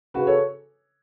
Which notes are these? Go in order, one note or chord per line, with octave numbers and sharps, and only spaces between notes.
C#3 F#4 B4
A4 C#5